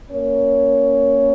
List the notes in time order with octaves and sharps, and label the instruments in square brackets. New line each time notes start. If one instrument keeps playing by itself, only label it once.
[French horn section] A#3 C#4 A#4 C#5